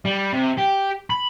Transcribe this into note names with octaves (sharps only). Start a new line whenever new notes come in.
G3
C3
G4
B5